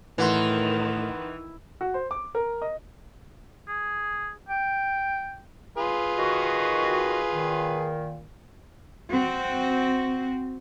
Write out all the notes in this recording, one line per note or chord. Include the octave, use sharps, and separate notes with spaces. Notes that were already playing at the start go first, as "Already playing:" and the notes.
A2 D#3 E3 B4 F#5 C6
F#4
C5
D6
A#4
D#5
G#4
G5
F4 G#4 B4
D#3 F#4
A#2 D#3
C4 F#4